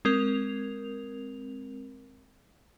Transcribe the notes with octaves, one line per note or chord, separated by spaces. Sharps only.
G#3 C4 A#4 F7